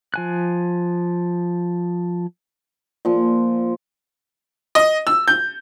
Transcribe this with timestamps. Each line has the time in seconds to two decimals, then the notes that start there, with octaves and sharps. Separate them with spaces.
0.14 F3 G#5 F#6
3.05 A#2 F3
4.75 D#5
5.07 E6
5.28 G6